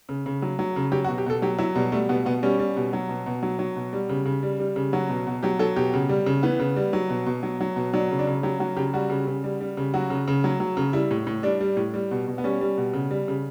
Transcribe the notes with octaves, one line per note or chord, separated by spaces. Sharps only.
C#3
C#3
F#3
F#3
C#3
F#3 G4
F#4
B2
G4
B2 A4
F#3 G4
F#3 E4
B2 G3
G3 A3
B2 B3
B2 B3
G3 C#4
G3
B2
F#3
B2
B2
F#3
F#3
B2
G3
C#3
C#3
G3
G3
C#3
F#3 F#4
B2
B2
F#3 G4
F#3 A4
B2 G4
C#3
G3
C#3
E3 B3
C#3
G3
F#3
B2
B2
F#3
F#3
B2
F#3 D4
C#3
D4
C#3
F#3 G4
F#3 F#4
C#3 G4
G3 F#4
C#3
C#3
G3
G3
C#3
F#3 F#4
C#3
C#3
F#3
F#3
C#3
G3 E4
A2
A2
G3 D4
G3
A2
G3
B2
B2
B3
G3 C#4
G3
B2
C#3
G3
C#3